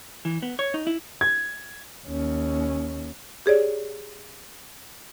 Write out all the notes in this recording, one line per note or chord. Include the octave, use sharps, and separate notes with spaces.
E3
B3
C#5
D#4
E4
G#6
D#2 C#4
G4 G#4 C#5 D5